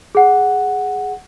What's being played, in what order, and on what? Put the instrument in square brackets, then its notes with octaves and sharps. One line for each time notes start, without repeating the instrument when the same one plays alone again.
[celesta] G#4 F#5